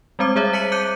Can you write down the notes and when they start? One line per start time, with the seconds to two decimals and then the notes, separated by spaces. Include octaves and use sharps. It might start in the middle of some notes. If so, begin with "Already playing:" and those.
0.19 G3 G#3 C4 C5 D6
0.36 G3 G#4 C5 C#5 E5
0.53 A5 B6 C#7 D#7 F#7
0.72 D6 F#6 G6 C#7 D#7